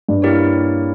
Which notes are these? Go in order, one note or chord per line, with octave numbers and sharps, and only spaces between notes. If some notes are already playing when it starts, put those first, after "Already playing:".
G2
A#3 E4 G4 A#4 C#5